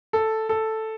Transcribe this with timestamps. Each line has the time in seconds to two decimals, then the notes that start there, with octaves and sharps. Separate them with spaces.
0.13 A4
0.49 A4